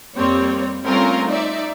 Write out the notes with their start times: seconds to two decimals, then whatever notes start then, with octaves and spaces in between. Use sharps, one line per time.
0.17 F2 G3 A#3 C4 C#5
0.86 G3 A3 C4 C#4 F4 A#4
1.28 D#4 D5 E5